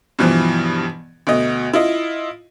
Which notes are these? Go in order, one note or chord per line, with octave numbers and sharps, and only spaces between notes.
G2 B2 E3 F3
D2 B2 D#5
E4 F4 D#5